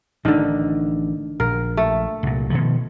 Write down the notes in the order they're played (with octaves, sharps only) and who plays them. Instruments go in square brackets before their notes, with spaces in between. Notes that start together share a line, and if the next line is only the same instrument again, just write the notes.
[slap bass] A1 D4 [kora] D3 D#3
[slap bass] A#1 [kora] A#4
[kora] A3
[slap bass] C2 A#2
B2 D#3 F3